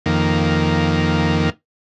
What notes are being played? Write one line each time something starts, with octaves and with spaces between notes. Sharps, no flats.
F2 D#3 A#3